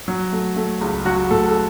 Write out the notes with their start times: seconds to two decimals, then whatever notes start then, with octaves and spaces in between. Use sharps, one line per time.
0.08 F#3
0.33 A3
0.56 A3
0.81 C#2
1.05 F#3 F#4
1.30 A2 A4
1.48 A4